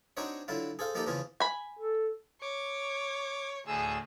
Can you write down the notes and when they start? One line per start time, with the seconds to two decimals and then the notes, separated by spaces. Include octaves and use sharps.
0.17 C4 D4 D#4 F#4 C5 C#5
0.48 D3 F#3 E4 F4
0.79 G#4 A4 C5 F5
0.95 F3 A#3 D#4 G4 A4
1.07 E2 C#3 F3 F4 G#4
1.40 G#5 B5
1.79 A4
2.42 C#5 D6
3.67 D2 A2 G#4 E6